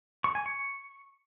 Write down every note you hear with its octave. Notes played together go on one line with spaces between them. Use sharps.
C#6
G#5
C#6